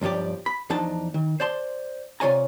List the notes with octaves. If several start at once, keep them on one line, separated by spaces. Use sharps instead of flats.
B1 G2 F3 G4 D5
B5
E2 F3 D4 D#4 A5
D#3
C5 D5 A5 C6
C3 F4 C#5 D5 G#5 A#5